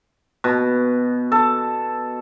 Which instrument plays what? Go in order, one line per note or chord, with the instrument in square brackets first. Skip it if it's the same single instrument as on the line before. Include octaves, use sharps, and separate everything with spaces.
[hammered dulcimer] B2
A4